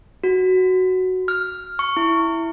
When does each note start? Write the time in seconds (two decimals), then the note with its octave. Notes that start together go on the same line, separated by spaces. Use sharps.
0.24 F#4
1.28 F6
1.79 C#6
1.97 E4